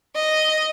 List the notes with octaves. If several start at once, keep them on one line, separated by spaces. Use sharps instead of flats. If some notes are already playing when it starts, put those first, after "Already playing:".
D#5